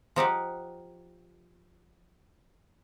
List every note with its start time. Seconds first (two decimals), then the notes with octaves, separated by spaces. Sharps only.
0.16 F3 D#4 G4 F#5